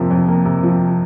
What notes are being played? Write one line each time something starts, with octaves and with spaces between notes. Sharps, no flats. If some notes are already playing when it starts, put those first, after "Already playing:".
Already playing: F2 C3 F3 A#3
F2
A#3
C3
F3